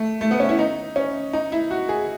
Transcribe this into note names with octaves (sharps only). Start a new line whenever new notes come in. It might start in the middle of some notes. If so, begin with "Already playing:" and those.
Already playing: A3
A3
B3
C#4
E4
D#4
C#4
D#4
E4
F#4
G#4